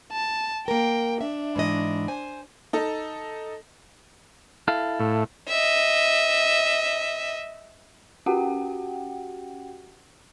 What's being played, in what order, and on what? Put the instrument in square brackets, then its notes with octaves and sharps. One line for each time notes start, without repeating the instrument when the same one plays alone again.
[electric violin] A5
[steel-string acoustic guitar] A#3 A#4 [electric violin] G5
[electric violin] D4 [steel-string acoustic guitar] E5
[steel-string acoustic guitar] G#2 E3 D#5
C5 G#5
[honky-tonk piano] D#4 A4
[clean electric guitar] E4 A4 F5
[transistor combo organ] A2
[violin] D#5 E5
[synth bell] C#4 F#4 G4 F#5 G5